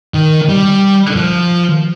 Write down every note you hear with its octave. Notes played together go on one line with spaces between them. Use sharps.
D#3
G3
F3